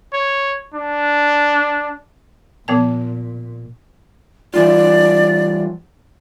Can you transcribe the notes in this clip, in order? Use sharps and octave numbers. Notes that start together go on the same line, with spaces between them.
C#5
D4
A#2 F3 B3 A5
E3 G3 F4 D5